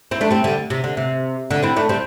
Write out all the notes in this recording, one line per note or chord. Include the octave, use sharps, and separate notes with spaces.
C4 E4
A3 D4
G3 C4
D3 G3
C3
D3
C3
D3
C4 E4
A3 D4
G3 C4